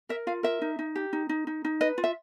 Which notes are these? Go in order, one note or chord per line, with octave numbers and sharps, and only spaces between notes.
A#4 E5
F4 F5
A#4 E5
D#4
D#4
G4
D#4
D#4
D#4
D#4
B4 D#5
F4
E5